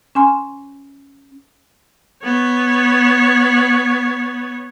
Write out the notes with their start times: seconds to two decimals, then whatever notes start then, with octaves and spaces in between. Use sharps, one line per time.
0.15 C#4 G#5 C6
2.24 B3 C#5